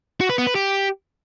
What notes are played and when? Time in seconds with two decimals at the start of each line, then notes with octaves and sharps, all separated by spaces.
0.21 F#4
0.29 B4
0.38 B3
0.47 B4
0.55 G4